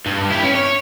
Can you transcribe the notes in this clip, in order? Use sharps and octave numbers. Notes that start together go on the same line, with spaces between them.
G2
E4 G4
C#4
C#5